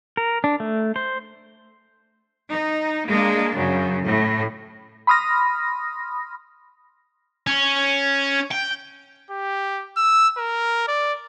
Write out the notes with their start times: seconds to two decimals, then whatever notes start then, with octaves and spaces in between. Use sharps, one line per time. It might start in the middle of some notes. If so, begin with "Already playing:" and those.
0.17 A#4
0.44 D4
0.60 A3
0.96 C5
2.52 D#4
3.07 G#3 A#3 D4
3.55 F#2 C#3
4.03 A2
5.07 B5 C6 D#6 F6 A#6
7.47 C#4
8.51 G5
9.31 G4
9.97 E6
10.38 A#4
10.88 D5